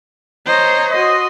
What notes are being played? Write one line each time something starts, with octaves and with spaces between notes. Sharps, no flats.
C5 C#5 D#5 A#5
F#4 D#5 C6